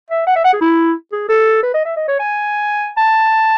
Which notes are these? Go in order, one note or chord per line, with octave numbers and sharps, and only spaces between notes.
E5
F#5
E5
F#5
G#4
E4
G#4
A4
B4
D#5
E5
D#5
C#5
G#5
A5